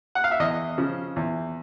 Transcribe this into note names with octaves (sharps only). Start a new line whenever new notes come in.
F#5
F5
E5
E2 D#5
C#3 F3
E2